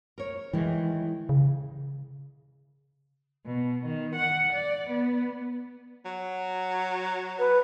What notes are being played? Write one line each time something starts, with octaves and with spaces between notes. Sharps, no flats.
A#4 C#5
D#3 E3 G#3
C#3
B2
D#3
F#5
D5
B3
F#3
B4